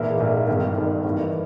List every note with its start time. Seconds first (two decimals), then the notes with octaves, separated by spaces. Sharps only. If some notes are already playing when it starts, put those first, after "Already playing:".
Already playing: A#1 G#2 E3 A#3 E4
0.20 A#1 G#2 E3 A#3 E4
0.48 G1 G2 D#3
0.76 G1 G2 D#3
1.04 G2 E3 A#3